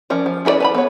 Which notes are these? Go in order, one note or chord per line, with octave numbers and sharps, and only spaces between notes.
F3 C#4 A#4 D5
F3
C#4 E4 A#4 B4 D5
B4 A5 B5
B3 C#5